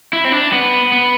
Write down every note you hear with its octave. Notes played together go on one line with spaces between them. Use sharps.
E4
C4
D4
B3
B3